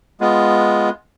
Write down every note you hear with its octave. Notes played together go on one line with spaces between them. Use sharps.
G#3 B3 F4